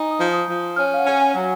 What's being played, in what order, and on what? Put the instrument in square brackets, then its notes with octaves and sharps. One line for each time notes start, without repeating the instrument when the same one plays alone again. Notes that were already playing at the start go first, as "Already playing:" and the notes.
Already playing: [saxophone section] D#4 [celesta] G#5 A#5
[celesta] D#6
[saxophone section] F3
[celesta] D#6
[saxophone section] F3
[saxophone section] C#4 [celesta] F6
[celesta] F5
F#5
[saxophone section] C#4
[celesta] G#5
[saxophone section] F#3